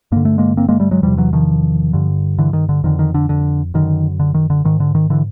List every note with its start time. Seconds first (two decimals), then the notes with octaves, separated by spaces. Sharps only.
0.12 G2 D3 A#3
0.25 A3
0.38 G#3 A#3
0.57 A#3 C4
0.69 G#3 A#3
0.80 G3 A3
0.91 F#3 G#3
1.02 E2 C3 F3 G3
1.17 E3 F#3
1.33 D#3 F3
1.93 G2 D3
2.38 D3 E3
2.53 D#3
2.69 D3
2.84 F2 D3 D#3
2.99 D#3
3.14 D3
3.29 D3
3.74 F#2 D3 D#3
4.20 D3
4.34 D#3
4.50 D3
4.65 G#2 D#3
4.80 D3
4.95 D#3
5.10 D3 E3